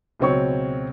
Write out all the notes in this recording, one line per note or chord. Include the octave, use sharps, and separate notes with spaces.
C#2 B2 F#3 C4 C#5 C#6